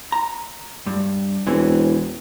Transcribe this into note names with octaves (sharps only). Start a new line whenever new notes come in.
A#5
G2
E1 E3 C4 C#4